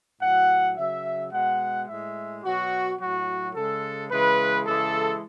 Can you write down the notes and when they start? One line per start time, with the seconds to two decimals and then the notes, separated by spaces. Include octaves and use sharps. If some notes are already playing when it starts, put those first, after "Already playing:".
0.21 A2 F#3 F#5
0.76 C#3 F#3 E5
1.32 B2 G#3 F#5
1.88 A2 G#3 E5
2.44 B2 F#3 F#4
2.99 A2 F#3 F#4
3.55 C#3 G#3 A4
4.10 C#3 E3 G#3 B4
4.66 C#3 E3 G#3 A4